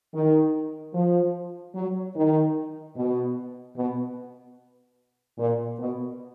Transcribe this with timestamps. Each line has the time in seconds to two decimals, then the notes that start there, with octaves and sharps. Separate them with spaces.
0.14 D#3
0.94 F3
1.75 F#3
2.16 D#3
2.97 B2
3.77 B2
5.39 A#2
5.79 B2